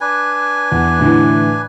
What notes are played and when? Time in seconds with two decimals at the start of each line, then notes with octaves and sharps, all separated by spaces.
0.01 D4 B4 G#5
0.72 E2
1.00 A2 D3 E3